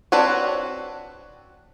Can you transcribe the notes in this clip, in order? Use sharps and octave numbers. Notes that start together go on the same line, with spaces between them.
C4 D4 F#4 B4 C#5